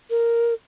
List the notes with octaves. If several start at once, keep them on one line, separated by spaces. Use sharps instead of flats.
A#4